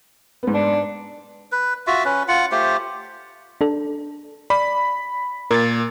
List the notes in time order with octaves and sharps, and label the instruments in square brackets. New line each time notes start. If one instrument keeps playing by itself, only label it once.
[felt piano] G#2 B3
[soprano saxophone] D4
[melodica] B4
F4 F#4 E5
C#4 B4
F4 F#5
A3 F4 G4 C5
[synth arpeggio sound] D4 A4
[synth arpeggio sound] D5 [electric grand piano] B5
[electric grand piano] A#2 [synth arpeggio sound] A#4 G#6 A6